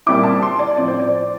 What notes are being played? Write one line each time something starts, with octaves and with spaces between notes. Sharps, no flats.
A#2 G3 C4 E4 D6
A5
C6
D5
A2 F3 C4 D5
C5
D5